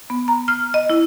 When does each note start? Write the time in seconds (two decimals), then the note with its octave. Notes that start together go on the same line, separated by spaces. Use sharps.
0.10 B3
0.28 A#5
0.48 F6
0.74 D#5
0.90 E4